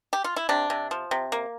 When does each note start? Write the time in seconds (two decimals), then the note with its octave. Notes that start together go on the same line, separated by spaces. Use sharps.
0.13 G4
0.24 F4
0.36 E4
0.49 C3 D4
0.70 C3
0.91 F3
1.11 C3
1.32 A#3